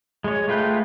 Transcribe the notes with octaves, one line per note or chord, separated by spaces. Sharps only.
G#3 C#5
G#3 A3 F4 B4 G5